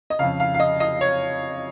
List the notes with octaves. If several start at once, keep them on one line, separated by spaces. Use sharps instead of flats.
D#5
F2 C#3 F5
F5
F5
D#5
D#5
C#5